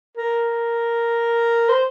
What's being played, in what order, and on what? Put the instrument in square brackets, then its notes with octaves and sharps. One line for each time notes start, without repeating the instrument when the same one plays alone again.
[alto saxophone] A#4
C5